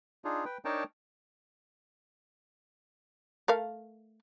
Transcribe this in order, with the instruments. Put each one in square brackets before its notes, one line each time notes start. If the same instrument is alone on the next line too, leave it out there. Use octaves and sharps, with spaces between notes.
[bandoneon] D4 D#4 F4 G#4
B4 G5
D4 D#4 A#4 C#5 G5 A5
[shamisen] A3 A#4 F5